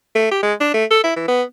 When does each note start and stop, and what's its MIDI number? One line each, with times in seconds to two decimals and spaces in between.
0.16 0.27 57
0.31 0.39 67
0.43 0.54 56
0.61 0.71 62
0.74 0.85 57
0.91 0.99 69
1.04 1.16 64
1.17 1.24 52
1.28 1.43 59